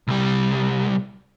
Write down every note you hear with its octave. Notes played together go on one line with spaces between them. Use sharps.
C2 G3